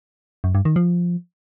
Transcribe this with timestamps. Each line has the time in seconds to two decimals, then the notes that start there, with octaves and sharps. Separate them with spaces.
0.44 F#2
0.55 G2
0.65 D#3
0.76 F3